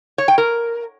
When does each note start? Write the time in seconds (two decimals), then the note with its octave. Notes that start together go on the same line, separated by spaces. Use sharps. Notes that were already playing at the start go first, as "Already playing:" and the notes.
0.18 C#5
0.28 G5
0.38 A#4